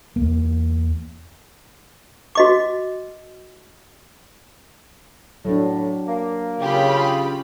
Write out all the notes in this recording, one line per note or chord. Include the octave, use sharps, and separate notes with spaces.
E2 A#3
F#4 D#5 D6
A2 F#3 D4
A#3
C#3 F4 G4 B5